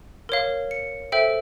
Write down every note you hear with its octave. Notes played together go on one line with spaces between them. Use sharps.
A#4 C#5 F5
C#7
A4 C5 E5 G5